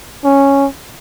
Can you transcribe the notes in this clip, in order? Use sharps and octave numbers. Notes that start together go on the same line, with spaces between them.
C#4